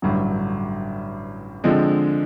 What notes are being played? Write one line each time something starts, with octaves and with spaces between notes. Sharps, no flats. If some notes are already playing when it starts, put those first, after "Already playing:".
A1 G2 D3 F#3
D3 F3 G#3 C4